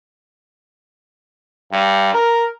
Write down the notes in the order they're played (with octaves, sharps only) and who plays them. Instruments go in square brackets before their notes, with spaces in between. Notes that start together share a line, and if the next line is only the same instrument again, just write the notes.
[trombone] G2
A#4